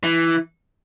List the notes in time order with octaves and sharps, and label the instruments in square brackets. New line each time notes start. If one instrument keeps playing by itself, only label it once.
[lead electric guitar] E3